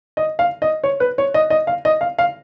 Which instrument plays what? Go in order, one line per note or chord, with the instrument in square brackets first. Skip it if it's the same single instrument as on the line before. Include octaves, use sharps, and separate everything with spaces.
[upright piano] D#5
F5
D#5
C#5
B4
C#5
D#5
D#5
F5
D#5
F5
F5